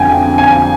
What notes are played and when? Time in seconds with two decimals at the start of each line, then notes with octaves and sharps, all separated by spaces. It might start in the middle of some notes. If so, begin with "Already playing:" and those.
Already playing: F2 D3 G5 G#5
0.38 G#5